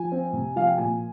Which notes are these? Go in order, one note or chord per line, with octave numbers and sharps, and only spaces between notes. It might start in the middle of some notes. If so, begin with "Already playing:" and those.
Already playing: F3 G#5
C4
C3
F3 F5
G5
A#2 G#5